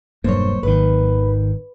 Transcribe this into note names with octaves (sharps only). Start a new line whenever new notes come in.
E1 G2 F#3 A#3 C5 C#5
G#1 D#3 B4